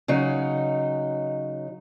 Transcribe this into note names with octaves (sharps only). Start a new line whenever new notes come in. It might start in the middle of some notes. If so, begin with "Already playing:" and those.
C#3 F#3 D#4